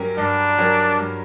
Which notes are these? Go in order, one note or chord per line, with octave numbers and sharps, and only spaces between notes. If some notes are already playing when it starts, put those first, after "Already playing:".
Already playing: G2 F#3 C#4 G4 A#4
G2 D4
F#3 C#4 G4 A#4
G2